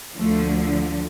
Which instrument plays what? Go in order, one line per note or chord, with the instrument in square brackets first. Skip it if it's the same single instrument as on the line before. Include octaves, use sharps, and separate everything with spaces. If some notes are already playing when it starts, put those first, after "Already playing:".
[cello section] D2 D3 F3 A3